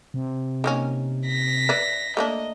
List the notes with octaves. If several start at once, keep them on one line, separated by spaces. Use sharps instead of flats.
C3
D#3 A#3 C#4
A#6 B6
B4 D5 E5
A3 A#3 D4 D#5